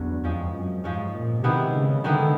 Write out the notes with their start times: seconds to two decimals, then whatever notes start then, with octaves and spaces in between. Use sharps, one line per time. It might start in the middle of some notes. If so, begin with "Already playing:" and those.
Already playing: E2 D3 F#3 A3 D4
0.24 F2 F3 G#3 C#4
0.54 F#2
0.84 G#2 F3 G#3 C#4
1.14 A#2
1.44 C3 D#3 G#3 B3 E4
1.74 C#3
2.04 D3 D#3 G#3 B3 E4